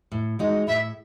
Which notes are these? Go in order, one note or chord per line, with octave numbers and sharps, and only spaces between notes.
A2
G#3 D#4 F#4
A2 E5